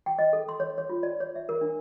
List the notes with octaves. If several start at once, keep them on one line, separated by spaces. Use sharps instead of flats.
G5
D#5
A4
C6
C#5
C#5
F4
D5
C#5
E5
A#4
D4